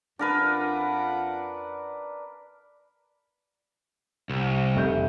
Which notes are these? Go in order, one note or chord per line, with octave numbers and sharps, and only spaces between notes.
F2 D4 F4 A#4 B4 F#5
C2
F1 E5 G6